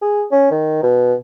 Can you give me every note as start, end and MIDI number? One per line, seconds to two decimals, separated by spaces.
0.01 0.23 68
0.31 0.48 61
0.51 0.82 51
0.83 1.14 47